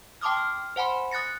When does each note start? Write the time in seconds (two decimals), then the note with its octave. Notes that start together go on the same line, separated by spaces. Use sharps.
0.21 G5 A5 C6 D6 D#6 F6
0.37 F6
0.76 C5 F#5 G#5 B5 C6
1.11 D#6 F#6 A6 A#6 C#7